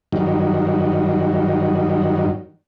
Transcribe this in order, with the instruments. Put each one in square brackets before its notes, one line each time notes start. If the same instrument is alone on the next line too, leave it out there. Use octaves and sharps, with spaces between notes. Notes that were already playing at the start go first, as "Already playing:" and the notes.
[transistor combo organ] G2 D#3 F#3